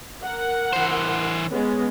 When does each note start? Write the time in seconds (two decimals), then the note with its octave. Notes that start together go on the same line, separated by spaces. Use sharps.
0.23 A#4 F#5
0.73 E3 C5
1.49 G#3 B3 C#4